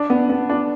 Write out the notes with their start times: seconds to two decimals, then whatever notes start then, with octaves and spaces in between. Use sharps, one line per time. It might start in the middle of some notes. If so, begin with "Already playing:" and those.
Already playing: D4
0.10 B3
0.29 B3
0.49 D4